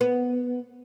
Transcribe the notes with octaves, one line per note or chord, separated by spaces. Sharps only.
B3